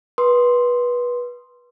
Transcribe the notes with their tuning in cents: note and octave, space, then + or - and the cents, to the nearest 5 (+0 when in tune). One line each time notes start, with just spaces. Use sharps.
B4 -20 C6 +5 D#6 +0